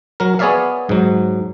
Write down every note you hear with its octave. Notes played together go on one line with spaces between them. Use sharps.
F#3 A#4
B3 G#4 C#5 D5 E5 F5
G#2 F#3